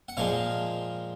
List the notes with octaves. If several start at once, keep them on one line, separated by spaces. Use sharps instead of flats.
F#5
A#2 F3 G#3 F5